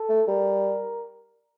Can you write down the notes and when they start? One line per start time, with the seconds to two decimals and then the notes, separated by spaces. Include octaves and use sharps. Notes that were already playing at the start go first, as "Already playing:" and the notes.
Already playing: A4
0.09 A3
0.27 G3 A#4